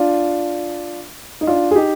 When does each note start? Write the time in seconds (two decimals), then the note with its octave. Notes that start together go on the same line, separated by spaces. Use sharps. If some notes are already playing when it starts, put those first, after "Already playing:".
Already playing: D4 F4
1.41 D#4
1.47 D4 F4
1.71 G#4
1.75 D#4 G4